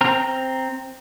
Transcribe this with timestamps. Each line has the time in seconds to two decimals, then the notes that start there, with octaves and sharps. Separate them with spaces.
0.01 C4 A#5 F6